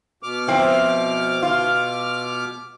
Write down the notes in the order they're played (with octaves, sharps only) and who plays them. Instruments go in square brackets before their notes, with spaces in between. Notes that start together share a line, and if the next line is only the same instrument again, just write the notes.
[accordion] B2 D6 F6
[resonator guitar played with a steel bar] F3 C4 E4
F4